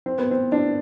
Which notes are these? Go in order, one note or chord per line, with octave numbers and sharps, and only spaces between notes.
C4
B3
C4
D4